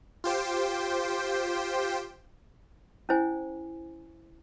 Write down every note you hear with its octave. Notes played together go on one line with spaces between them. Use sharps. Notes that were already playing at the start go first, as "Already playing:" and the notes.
F4 G4 C5 G5
C#4 E4 C5 G#5